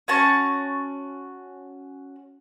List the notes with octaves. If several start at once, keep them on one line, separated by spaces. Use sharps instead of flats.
C#4 F#4 A5 C#6